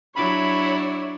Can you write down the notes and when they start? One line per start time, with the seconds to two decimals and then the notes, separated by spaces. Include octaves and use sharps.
0.16 F#3 D4 E4 C#5 B5